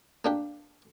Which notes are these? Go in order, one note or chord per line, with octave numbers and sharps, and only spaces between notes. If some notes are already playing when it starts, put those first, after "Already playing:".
A#3 D4 G4